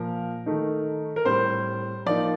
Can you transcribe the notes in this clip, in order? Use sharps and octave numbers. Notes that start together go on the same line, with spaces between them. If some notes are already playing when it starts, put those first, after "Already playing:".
Already playing: A#2 F3 A#3 A#4
D#3 A3 D#4
A#4
A2 G3 C4 C5
F3 A#3 D#4 D5